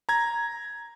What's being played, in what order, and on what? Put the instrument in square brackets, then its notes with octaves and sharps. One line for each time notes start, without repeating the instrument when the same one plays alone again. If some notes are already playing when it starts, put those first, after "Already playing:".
[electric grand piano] A#5 G#6